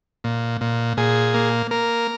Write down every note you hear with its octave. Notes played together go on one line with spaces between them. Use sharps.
A#2
A#2
A#2 G#4
A#3
A#3 A#4